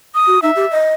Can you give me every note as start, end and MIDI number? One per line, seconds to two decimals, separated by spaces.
0.15 0.40 87
0.27 0.38 66
0.42 0.51 63
0.42 0.74 76
0.56 0.66 67
0.71 0.94 75